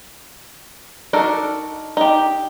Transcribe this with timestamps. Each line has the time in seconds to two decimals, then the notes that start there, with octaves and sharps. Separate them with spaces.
1.13 D4 D#4 F#4 A4 A#4
1.97 D#4 G4